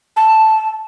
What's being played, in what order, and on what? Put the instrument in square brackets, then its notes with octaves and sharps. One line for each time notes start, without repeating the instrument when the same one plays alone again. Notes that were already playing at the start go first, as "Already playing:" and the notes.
[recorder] A5